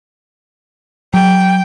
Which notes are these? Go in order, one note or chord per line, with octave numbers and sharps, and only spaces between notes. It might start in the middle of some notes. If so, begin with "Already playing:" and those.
F#3 G5